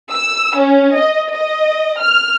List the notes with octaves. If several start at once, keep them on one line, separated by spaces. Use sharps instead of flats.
E6
C#4
D#5
D#5
F6